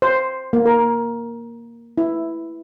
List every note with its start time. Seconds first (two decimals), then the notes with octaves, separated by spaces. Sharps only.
0.02 C5
0.53 A#3
0.66 A#4
1.98 E4